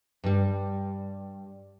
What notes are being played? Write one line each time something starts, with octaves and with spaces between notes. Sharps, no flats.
G2 G3